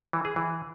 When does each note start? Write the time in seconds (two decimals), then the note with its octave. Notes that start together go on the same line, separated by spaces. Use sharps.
0.13 E3
0.25 G#4
0.36 E3